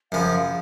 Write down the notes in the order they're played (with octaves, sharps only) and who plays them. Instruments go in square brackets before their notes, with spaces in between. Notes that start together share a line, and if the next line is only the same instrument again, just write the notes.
[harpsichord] F#2 C#3 F3 [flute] F5